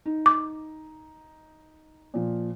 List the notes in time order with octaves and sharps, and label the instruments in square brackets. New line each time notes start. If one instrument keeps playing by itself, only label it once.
[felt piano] D#4
[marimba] D6
[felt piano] A#2 F3